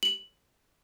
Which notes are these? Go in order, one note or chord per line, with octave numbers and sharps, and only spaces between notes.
F#7